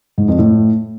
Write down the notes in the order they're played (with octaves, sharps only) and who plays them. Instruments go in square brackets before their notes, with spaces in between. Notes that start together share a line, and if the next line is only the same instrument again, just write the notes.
[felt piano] G#2
F2
A2